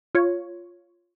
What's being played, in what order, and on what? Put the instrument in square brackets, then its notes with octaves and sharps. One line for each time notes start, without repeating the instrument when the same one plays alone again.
[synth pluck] F4 C#5